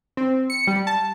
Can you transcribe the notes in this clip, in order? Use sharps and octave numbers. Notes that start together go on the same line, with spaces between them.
C4
C#7
G3
A5